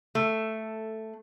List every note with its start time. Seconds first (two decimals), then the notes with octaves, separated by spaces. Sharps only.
0.15 A3